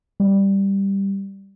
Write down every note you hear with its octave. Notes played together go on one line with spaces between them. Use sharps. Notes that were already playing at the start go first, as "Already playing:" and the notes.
G3